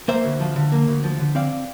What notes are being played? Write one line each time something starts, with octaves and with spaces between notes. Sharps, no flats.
A#3 C5 E5
D2
F3
D3
A#3
D2
F3
D3
C4 D5 F5